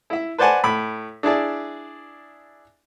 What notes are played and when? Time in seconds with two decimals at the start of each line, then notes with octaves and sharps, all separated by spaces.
0.10 E4 E5
0.38 B4 C5 D5 F#5 G#5 A5
0.64 A2 B5
1.23 D4 E4 G#4 D5